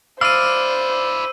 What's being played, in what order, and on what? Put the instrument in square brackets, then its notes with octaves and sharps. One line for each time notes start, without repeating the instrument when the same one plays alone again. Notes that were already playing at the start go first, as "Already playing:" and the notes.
[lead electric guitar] D4 E4 [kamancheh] C5 [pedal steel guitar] D5 F5 [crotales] E6 D#7